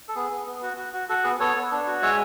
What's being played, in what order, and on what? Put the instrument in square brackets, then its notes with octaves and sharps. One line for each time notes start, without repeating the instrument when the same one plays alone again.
[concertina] A4
B3 G#4
B3
B3
F#4
F#4
F#4
F#4 A4
B3 G#4 B4
B3 A4 C#5
B3
D4
F#4
G#3 C#5 E5